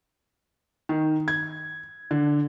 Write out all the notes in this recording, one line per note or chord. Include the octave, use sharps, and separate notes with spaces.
D#3
G#6
D3